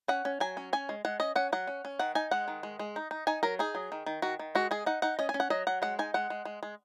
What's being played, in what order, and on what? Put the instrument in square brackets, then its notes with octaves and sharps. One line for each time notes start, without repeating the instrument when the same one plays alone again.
[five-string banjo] C#4 F#5
C#4
F#3 G#5
C#4
C#4 G#5
G#3
G#3 F#5
C#4 D#5
C#4 F#5
F#3 F#5
C#4
C#4
D#3 F#5
D#4 G#5
G#3 F#5
D#3
G#3
G#3
D#4
D#4
D#4 G#5
F#3 A#4
D#4 G#4
F#3
D#3
D#3
D#3 F#4
D#3
G#3 F#4
G#3 G#4
D#4 F#5
D#4 F#5
C#4 D#5
G#5
C#4
F#5
F#3 D#5
F#3 F#5
G#3 F#5
D#4 G#5
G#3 F#5
G#3
G#3
G#3